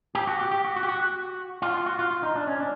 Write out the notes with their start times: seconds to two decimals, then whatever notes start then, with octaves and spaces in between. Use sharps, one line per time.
0.15 G4
0.27 F#4
0.40 G4
0.51 G4
0.65 F#4
0.76 F#4
0.83 G4
0.89 F#4
1.62 F4
1.74 F4
1.86 F#4
1.99 F4
2.11 F4
2.23 D#4
2.36 D4
2.47 C#4
2.60 D4